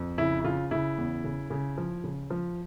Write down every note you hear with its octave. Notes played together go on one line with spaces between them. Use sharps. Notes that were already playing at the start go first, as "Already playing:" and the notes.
Already playing: F2
C#3 E4
E4
C#3 F4
C#3 E4
E2
C#3
C#3
F3
C#3
F3